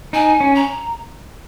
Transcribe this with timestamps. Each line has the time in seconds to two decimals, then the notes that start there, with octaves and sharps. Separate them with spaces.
0.13 D#4 G#5
0.40 C#4
0.55 A#5